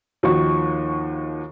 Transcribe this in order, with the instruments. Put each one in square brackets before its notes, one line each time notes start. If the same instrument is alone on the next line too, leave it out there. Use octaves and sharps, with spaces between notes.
[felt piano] D#2 D#3 F3 F#4 C#6